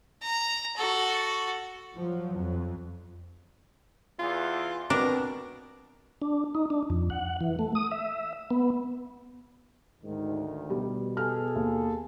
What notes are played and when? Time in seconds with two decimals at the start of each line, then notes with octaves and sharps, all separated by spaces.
0.22 A#5
0.77 F#4 A4
1.95 F3 F#3
2.37 F2
4.19 E2 F4
4.90 B2 C4 D4 A#4 B4
6.22 D4
6.55 D#4
6.70 D4
6.90 F2
7.10 F#5
7.41 E3
7.59 A3
7.75 D#6
7.92 E5
8.51 B3
10.04 D2 G#2 D#3
10.70 B2 G3
11.17 G#4 A4 F6
11.56 D#2